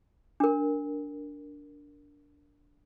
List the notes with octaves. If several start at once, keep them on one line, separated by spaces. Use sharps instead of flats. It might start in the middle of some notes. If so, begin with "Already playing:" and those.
D4 A#4